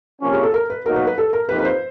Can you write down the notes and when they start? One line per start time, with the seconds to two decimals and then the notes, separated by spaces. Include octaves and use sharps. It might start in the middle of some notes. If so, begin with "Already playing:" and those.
0.22 C3 F3 A#3 C#4
0.33 G#4
0.43 A4
0.54 A#4
0.70 B4
0.85 B2 F#3 A#3 D#4 F#4 A#4
0.96 B4
1.07 B4
1.18 A4
1.33 A#4
1.49 F2 C3 F3 A#3 D#4 B4
1.59 B4
1.65 C5